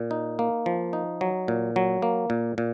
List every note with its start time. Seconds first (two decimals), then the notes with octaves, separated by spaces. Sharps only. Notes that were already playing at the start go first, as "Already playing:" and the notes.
Already playing: A#2
0.11 D#4
0.39 A#3
0.66 F3
0.93 D#4
1.21 F#3
1.48 A#2
1.76 F#3
2.02 A#3
2.30 A#2
2.58 A#2